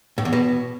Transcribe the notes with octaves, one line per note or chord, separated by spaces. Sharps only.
A2
E2
B2